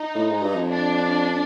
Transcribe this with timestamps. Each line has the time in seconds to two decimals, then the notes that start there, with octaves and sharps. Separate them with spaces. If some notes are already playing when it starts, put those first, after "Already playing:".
Already playing: D#4
0.15 A2
0.30 G#2
0.42 G2
0.55 F2
0.69 D4